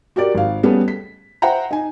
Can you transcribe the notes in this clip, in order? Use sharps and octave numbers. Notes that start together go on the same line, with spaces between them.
F#4 G4 A#4 D5
G#1 F5
G3 A3 B3 C#4 G#4 B4
B6
C5 E5 F#5 G5 A#5
D#4 G#5